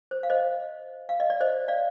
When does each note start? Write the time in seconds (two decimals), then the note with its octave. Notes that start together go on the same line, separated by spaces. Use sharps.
0.11 C5
0.23 F5
0.30 C5 D#5
1.09 F5
1.20 D#5
1.30 D5
1.41 C5 D#5
1.68 D5 F5